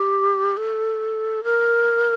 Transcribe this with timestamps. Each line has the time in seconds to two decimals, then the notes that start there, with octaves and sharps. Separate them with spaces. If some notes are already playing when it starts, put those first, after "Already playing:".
Already playing: G4
0.57 A4
1.44 A#4